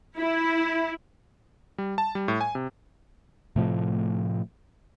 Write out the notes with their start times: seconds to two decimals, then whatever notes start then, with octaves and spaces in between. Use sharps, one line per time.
0.18 E4
1.78 G3
1.98 A5
2.15 G3
2.28 A2
2.41 G#5
2.55 C3
3.56 A2 C3 F3 A3